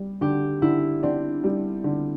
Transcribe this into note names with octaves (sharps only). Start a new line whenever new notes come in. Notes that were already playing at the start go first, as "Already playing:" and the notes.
Already playing: G3
D3 G4
D3 E4
C4 D4
G3
D3